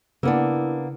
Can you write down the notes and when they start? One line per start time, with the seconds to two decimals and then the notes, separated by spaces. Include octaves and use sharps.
0.23 C#3 A#3 B3 D4 E4